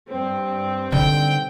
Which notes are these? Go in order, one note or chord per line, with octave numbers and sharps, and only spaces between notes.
G2 C4
D3 D#3 G5